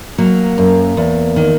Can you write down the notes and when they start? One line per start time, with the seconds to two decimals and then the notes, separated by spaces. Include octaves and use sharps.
0.18 F#3 A#3
0.58 F#2
0.97 E2
1.36 D#3